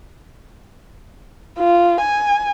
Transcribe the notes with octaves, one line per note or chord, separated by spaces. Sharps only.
F4
G#5